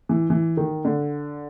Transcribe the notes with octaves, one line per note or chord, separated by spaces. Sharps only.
E3
E3
D#3
D3